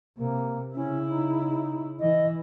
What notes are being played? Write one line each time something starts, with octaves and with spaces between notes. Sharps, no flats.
C3 A#3
C#3 C#4 E4
D#4
E3 D#5